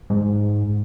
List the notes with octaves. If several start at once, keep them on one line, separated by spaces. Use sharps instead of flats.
G#2